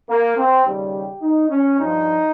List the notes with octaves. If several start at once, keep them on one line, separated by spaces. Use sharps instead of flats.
A#3
C4
D#2 C#3 G3
G4
D#4
C#4
G2 F3 D#4